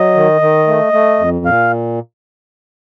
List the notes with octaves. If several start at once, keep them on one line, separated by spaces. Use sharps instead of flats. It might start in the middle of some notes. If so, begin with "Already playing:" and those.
Already playing: F#3 D#5
D#3
D#3
A3
A3
F2
A#2 F5